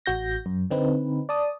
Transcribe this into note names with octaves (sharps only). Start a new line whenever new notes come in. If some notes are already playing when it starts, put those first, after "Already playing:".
A1 F#4 G6 A#6
F#2
D3 C4 D#4 B4
D5 A5 D#6